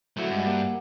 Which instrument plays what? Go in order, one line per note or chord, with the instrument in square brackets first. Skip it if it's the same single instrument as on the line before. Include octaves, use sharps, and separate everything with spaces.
[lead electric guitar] F#3 A3 [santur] C4 E4 F#4
[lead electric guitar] G2 [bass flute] G#3 [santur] G#5
[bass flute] A#3 [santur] G4 F#5